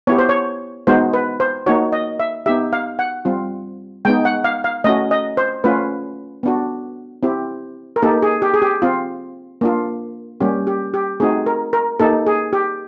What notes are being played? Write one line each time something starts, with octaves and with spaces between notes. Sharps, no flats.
B3 E4 G4 C#5
C5
C#5
G#3 B3 D#4 F#4 C5
B4
C5
A#3 D#4 F#4 C#5
D#5
E5
B3 D#4 G4 E5
F5
F#5
G3 C4 F4
G#3 B3 D#4 G5
F#5
F5
F5
A3 C#4 F#4 D#5
D#5
C5
A3 C#4 F4 B4
B3 D4 F#4
C4 E4 G4
A#4
A#3 D#4 G4 A4
G#4
G4
G#4
G4
C4 F4
A#3 D4 F4
G3 A#3 C#4 G4
G4
G4
A3 C4 D#4 F#4 G#4
A#4
A#4
A#3 D#4 G4 A4
G#4
G4